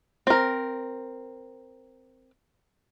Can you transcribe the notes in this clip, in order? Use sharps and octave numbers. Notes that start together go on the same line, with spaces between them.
C4 A#4